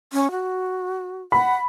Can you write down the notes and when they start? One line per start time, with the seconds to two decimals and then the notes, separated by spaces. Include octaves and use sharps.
0.13 C#4
0.31 F#4
1.32 F#5 B5